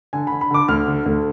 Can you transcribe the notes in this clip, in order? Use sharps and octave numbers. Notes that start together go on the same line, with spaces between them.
D3 G#5
B5
D3
B5
D3 D6
D2 F6
D3
D2